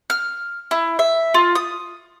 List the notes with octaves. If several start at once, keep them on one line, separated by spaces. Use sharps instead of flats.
F6
E4
E5
F4
D#6